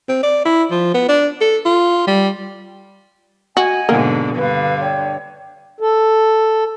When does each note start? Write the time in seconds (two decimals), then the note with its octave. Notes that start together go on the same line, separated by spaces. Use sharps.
0.09 C4
0.23 D5
0.45 E4
0.71 F3
0.95 B3
1.09 D4
1.41 A4
1.66 F4
2.07 G3
3.57 F#4 D#5 F#5 G#5
3.89 G#2 B2 D3 A#3
4.36 G2 D3 B4 F5
4.79 C#5 D5 G5
5.80 A4